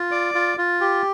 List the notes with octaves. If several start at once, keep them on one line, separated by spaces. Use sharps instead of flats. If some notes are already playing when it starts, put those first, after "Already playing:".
Already playing: F4
D5
F4
F4
G4